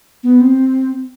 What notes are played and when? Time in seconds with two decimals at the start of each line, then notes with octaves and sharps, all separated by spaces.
0.23 B3
0.41 C4